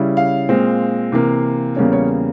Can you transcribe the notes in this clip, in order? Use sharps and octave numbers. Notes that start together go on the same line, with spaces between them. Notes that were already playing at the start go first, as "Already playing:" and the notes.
Already playing: C#3 G3 C#4 E4
F5
A#2 G#3 C4
C3 E3 A#3
E2 C#3 G3 A#3 C#4
C#5